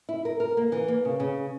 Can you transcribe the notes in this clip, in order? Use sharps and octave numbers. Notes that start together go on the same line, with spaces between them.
E4
A#4
A#4
A#3
E3
A#3
C#3
C#3